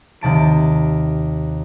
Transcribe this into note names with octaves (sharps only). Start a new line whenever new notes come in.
D#2 C3 A5 D7